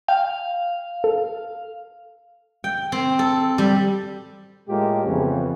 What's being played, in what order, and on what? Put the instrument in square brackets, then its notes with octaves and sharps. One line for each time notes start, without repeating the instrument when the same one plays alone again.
[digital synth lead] F5 [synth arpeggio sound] G5
[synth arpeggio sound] A4
[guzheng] G5
C4
A4
G3
[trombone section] A2 G#3 A#3 F4 G4
F2 C#3 E3 B3 C#4